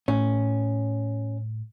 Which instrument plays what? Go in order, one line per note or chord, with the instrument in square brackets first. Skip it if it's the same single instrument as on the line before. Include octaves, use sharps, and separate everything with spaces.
[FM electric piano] A2 [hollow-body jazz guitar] C#4